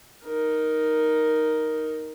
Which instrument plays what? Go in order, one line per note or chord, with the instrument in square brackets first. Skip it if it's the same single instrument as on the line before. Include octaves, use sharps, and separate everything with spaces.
[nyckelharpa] D#4 A#4